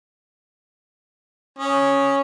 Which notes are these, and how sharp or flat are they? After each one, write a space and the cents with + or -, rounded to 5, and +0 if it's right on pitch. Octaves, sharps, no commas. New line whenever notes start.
C#4 +0 D#6 +0